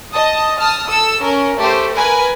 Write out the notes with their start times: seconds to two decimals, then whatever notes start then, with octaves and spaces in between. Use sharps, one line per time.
0.12 D#5 A5 D#6
0.59 A5 D#6 F6
0.88 A4 E6
1.22 C#4 A#4
1.58 A3 G4 C5
1.93 A#4 B4 G#5